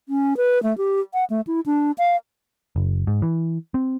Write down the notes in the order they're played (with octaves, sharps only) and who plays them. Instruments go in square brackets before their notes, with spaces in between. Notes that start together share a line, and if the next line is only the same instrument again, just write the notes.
[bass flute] C#4
B4
A3
G4
F#5
A3
E4
D4
F5
[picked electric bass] F#1
G#2
E3
C4